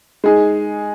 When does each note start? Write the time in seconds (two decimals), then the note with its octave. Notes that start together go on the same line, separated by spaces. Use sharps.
0.24 G#3 D#4 G#4